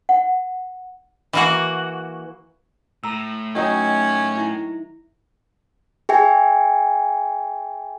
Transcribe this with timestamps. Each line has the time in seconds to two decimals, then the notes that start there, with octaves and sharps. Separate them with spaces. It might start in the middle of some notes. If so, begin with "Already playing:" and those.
0.09 F#5
1.33 E3 A#3 F#4
3.04 A2 A#5 E6
3.55 D#3 F#3 C#4 D#4
4.37 E4
6.09 G#4 E5 G5 G#5